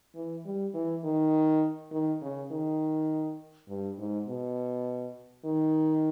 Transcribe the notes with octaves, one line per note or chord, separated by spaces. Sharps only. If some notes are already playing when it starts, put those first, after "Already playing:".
E3
G3
E3
D#3
D#3
C#3
D#3
G2
G#2
B2
D#3